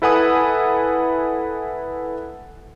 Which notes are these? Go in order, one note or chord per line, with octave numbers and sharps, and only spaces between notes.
E4 A4 B4 F#5 G#5 D#6